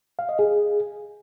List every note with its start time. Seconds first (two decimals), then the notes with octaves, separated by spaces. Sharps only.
0.19 F5
0.29 D#5
0.39 G#4